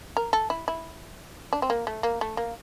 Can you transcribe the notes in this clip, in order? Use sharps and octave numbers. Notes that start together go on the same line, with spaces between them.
A#4
A4
E4
E4
D4
C4
A#3
A3
A#3
A3
A#3